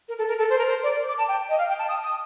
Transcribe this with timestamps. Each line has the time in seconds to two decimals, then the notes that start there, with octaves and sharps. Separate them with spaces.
0.09 A#4
0.18 A4
0.28 A#4
0.39 A4
0.50 C5
0.58 A#4
0.68 C5
0.83 D5
1.08 D6
1.18 A5
1.28 G5
1.49 D#5
1.58 F5
1.69 G5
1.79 A5
1.89 D#6
2.03 D#6